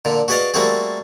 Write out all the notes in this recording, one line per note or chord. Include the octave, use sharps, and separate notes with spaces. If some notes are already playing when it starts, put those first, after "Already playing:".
A#2 D3
F#4 G#4 B4 D5 D#5 F5
G3 A3 A#3 C4 F#4 G#4